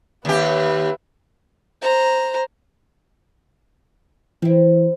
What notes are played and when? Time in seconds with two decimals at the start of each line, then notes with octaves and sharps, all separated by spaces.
0.25 D#2 G4 B4 E5
1.82 C5 A#5
4.42 E3 C4 E4